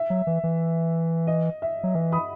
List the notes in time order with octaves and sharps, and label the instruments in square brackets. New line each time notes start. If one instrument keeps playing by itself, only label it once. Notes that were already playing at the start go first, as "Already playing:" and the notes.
Already playing: [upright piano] E5
[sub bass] F#3
E3
E3
[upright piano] D#5
E5
[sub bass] F#3
[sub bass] E3 [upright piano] E5
[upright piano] B5 D#6